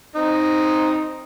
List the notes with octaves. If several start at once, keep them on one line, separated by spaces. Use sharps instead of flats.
C4 D#4